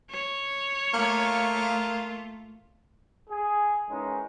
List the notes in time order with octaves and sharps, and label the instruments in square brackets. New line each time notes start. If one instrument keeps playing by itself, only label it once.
[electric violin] C#5
[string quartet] A3 F4 [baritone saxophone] A#3
[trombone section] G#4
D#3 E3 G#3 C#4 D#4